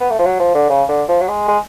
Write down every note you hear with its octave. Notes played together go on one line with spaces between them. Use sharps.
B3
A3
F3
F#3
F3
D3
C#3
D3
F3
F#3
G#3
G#3